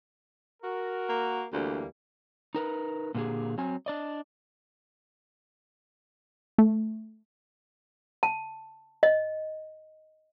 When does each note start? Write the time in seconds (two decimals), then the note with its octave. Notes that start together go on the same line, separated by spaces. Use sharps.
0.62 F#4 A#4
1.09 A#3
1.53 D2 E3 G3 A#3
2.55 D#4 A#4 B4
3.15 A#2 D3 A#3 G4 G#4
3.58 F#3 C4 G#5
3.86 D4 D5 D#5
6.58 A3
8.23 A5
9.03 D#5